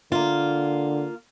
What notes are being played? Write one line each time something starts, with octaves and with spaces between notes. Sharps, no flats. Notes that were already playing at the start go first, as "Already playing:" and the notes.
D3 A#3 F4